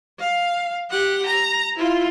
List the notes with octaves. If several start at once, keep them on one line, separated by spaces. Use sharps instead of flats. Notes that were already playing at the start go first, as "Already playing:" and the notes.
F5
G4 F#5
A#5
E4 F4